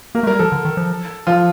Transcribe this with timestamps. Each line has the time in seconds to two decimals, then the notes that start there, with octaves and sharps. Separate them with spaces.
0.15 A#3 A#4
0.23 A3
0.27 G3 A#4
0.39 F3 A4
0.52 D3
0.65 D#3
0.77 F3
1.27 F3 F4